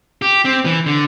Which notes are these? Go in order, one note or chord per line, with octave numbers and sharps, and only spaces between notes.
G4
C4
E3
D3